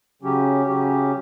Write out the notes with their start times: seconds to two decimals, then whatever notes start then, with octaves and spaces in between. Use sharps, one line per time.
0.22 C#3 F#3 C#4 G4
0.67 C#3 F#3 C#4 G4